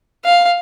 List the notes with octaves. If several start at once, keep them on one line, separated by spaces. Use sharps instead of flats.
F5